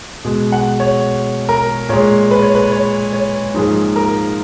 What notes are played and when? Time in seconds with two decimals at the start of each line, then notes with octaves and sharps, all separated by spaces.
0.25 B2 G#3
0.52 F#5
0.80 C#5
1.49 A#4
1.89 A#2 G#3 C#5
2.31 B4
2.42 C#5
2.55 B4
2.72 C#5
3.13 C#5
3.54 G#2 F3 A#3 G#4
3.96 A#4